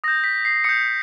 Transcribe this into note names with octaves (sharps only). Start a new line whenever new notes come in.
D#6 G6 A#6
B6
C7
D#6 G6 C#7